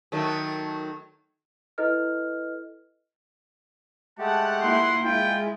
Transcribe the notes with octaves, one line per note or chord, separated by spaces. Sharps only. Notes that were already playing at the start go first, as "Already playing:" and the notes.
D#3 F#3 A3
E4 A4 B4 D#5 F6
G#3 A3 G4 F#5 A5
A#3 E4 F4 C6
G#3 E4 F4 G5